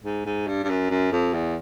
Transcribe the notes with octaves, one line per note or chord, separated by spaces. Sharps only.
G#2
G#2
G2
G2
F#2
F#2
F2
E2